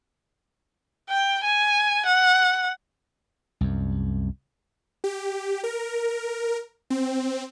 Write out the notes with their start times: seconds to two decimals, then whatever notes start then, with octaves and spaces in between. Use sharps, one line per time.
1.09 G5
1.44 G#5
2.06 F#5
3.61 C2 F#2
5.04 G4
5.64 A#4
6.90 C4